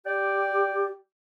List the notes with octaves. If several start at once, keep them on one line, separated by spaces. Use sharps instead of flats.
G4 D5 G5